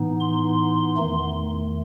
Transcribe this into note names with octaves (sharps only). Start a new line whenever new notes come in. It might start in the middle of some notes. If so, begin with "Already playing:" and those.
Already playing: A2 E3 B3 D#4
C6
E2 D#3 A3